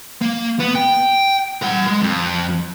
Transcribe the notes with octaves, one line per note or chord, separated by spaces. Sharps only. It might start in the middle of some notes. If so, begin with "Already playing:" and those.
A#3
B3
G5
A#4 F#5
G#3
F2